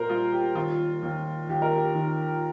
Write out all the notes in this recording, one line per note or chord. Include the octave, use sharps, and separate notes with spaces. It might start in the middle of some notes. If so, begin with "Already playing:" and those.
Already playing: A#1 A#2 A#4 C5
G3 F4
G4
D#2 F4
D#2
D#2 G4
A#4
G4
D#3